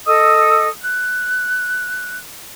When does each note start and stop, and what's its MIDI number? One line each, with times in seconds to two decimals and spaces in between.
0.06 0.67 69
0.06 0.67 75
0.06 0.67 87
0.06 0.67 88
0.82 2.15 90